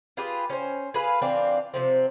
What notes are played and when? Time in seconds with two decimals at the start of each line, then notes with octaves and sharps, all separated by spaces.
0.17 F4 G4 G#4 B4
0.50 C#4 C5
0.94 G#4 B4 F5
1.22 E3 C4 D4 F4
1.74 C3 F3 C4